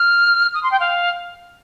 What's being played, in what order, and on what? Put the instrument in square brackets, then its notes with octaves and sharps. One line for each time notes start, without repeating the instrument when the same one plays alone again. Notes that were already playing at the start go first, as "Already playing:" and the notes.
Already playing: [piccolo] F6
D#6
C6
G5
F5